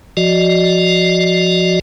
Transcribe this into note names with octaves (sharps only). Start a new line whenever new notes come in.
F3 F#4 D5 D#5